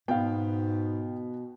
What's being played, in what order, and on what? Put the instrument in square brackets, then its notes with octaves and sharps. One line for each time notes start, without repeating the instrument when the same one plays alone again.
[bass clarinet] G#2 [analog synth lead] B2 [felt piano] B3 [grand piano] F5 G5